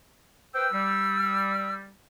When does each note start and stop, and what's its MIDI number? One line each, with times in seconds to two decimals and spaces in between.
0.54 0.66 71
0.54 0.66 72
0.54 0.66 79
0.54 1.74 88
0.72 1.91 55